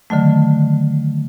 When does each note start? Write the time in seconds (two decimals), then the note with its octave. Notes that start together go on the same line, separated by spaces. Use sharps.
0.10 D3 D#3 F#3 A3